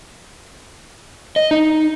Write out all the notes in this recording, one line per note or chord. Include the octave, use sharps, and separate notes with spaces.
D#5
D#4